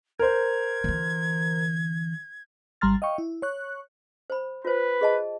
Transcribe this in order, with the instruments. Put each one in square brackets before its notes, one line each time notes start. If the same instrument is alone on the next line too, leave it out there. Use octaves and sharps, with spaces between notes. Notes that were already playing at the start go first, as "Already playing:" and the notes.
[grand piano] A#4 C5 [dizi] G#6
[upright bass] D3 E3
[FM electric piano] G#1 G3 A#5 C6 F6 A6
D#5 F5 G5 C#6
E4
C#5 C#6 F#6
[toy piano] C5 B5
[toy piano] F4 C5 [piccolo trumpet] B4
[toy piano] G#4 D#5 A5